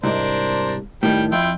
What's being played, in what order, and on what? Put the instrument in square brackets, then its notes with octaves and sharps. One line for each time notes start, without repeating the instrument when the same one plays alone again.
[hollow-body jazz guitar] C2 G#2 [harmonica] D4 A#4 C5
[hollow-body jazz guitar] A2 D#3 [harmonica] G3 G5
[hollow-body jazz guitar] F2 [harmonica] E4 F4 G5